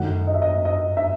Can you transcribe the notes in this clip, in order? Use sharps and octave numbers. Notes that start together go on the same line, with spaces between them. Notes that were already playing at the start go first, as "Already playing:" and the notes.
Already playing: F#2 D#3 A3 F#5
D#5
E5
D#5
D#5
E5